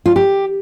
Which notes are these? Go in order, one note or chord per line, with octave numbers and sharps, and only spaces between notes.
F4
G4